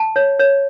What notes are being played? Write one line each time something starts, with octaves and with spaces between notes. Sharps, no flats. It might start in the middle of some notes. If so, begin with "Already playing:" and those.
Already playing: A5
C#5
C#5